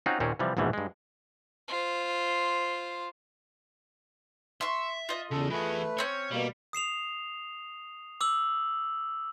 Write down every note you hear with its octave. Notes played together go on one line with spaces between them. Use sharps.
C4 C#4 D#4 F4 F#4
D#2 A#2 C4 C#4
C3 E3 F3 G3
A#1 E2 G#2 B2 E3 G3
G2 G#3
F4 C5
E5 C6 C#6
F4 D#5
E2 C#3 A4
E3 A3 G#4 B4
C4 C#4 C#5
B2 G3 A#3
D#6 C7 E7 F7
D6 E6 F#7